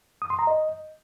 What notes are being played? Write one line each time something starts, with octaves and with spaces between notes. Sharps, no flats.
D#6
C6
A#5
D#5